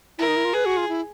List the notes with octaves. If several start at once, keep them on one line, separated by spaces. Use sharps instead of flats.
E4 A#4
D#4
E4
F4
G#4 B4
F#4
F4
E4